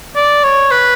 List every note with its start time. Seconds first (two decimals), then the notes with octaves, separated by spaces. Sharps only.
0.16 D5
0.44 C#5
0.71 B4